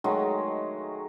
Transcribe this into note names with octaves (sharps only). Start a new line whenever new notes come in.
D#3 F#3 G#3 A3